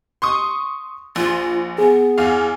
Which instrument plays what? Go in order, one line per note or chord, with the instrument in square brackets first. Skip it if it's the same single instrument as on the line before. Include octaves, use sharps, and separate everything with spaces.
[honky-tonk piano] C6 C#6 D#6
[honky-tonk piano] A#1 [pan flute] F4
[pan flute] B3 [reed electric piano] G#4
[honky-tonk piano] E2 F5